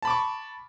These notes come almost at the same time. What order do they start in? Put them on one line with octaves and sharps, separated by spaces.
A5 B5 D6 C#6